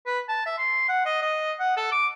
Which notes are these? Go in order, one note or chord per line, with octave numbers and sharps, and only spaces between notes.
B4
A5
E5
C6
F#5
D#5
D#5
F#5
A4
D6